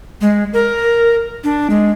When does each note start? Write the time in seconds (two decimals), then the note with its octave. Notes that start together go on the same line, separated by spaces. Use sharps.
0.21 G#3
0.53 A#4
1.44 D4
1.70 G#3